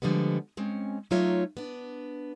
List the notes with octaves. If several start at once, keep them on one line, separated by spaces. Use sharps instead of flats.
D3 F3 G3 G#3 B3
G#3 C4 C#4
F#3 A3 D#4 F4 C#5 E5
B3 D4